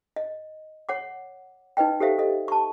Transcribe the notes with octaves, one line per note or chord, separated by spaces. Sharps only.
D#5
C#5 F#5 D6
D#4 B4 D#5 G5
G4 A4 C5 E5 F5
A4 D#5
A5 C#6